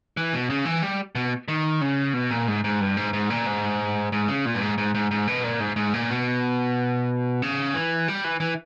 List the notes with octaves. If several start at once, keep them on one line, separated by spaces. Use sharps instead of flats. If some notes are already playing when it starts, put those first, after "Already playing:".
E3
B2
C#3
E3
G3
B2
D#3
C#3
B2
A#2
G#2
G#2
G2
G#2
G#2
A#2
G#2
G#2
C#3
A#2
G2
G#2
G#2
G#2
G#2
B2
A#2
G#2
G#2
A#2
B2
C#3
E3
G3
E3
E3